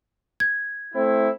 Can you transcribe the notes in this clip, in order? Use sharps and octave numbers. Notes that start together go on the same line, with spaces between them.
G#6
A3 C4 E4